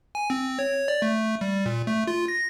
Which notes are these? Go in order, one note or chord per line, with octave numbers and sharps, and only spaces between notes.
G#5
C4
C#5
D5
A3
G3
A#2
A3
F4
A#6